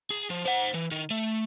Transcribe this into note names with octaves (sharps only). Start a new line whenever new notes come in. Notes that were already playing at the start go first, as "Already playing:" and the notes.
G#4
F3
C5 F#5
E3
D#3
A3